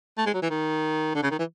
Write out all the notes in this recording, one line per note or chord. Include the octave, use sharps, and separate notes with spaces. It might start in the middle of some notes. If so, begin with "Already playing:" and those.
A3
G#3
F#3
E3
D#3
D3
C#3
D#3
E3